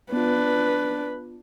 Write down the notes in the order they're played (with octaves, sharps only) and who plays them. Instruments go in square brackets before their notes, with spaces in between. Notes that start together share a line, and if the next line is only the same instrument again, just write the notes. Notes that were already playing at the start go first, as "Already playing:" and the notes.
[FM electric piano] B3 F4 [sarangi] D4 [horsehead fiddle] B4